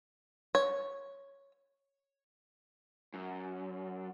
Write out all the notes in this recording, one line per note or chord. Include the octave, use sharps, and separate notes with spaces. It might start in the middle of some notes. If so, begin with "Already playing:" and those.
C#5
F#2